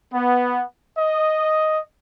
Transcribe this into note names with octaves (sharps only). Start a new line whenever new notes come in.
B3
D#5